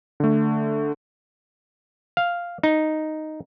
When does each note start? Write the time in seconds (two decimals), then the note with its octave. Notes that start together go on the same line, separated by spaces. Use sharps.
0.20 D3 A3
2.17 F5
2.63 D#4